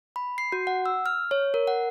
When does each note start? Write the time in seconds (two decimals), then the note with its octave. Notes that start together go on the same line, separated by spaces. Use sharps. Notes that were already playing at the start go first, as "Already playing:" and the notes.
0.16 B5
0.38 C7
0.52 F#4
0.67 F#5
0.86 E6
1.06 F6
1.31 C#5
1.54 A#4
1.67 F#5